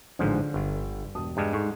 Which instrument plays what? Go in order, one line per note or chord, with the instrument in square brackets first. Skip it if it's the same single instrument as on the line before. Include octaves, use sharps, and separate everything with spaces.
[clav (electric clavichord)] A1 G#2 F3 [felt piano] D3
[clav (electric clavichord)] G1
[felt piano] E1 A5 D#6
[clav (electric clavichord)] G2 G3 G#3
[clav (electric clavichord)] G#2 [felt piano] A4 C#6